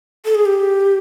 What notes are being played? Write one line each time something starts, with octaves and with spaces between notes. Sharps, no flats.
A4
G#4
G4